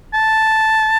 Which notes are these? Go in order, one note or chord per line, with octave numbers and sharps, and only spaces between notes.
A5